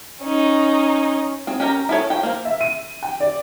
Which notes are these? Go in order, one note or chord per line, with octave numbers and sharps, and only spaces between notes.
C#4 D#4
C4 G#4
C#4 G4 A#4 A#5
E4 G#4 A4 C#5
F3 G5
A#3 C5
E5
D#7
G5
D5